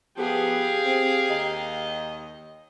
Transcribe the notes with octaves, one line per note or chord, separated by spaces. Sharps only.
F3 B3 G4 G#4 F5
C4
D#2 D#5